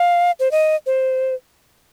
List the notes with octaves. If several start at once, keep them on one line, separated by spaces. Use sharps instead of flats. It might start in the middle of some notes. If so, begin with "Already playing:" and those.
Already playing: F5
C5
D#5
C5